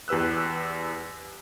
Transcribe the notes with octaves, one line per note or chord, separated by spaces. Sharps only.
E2 G4 B4 E6 F#6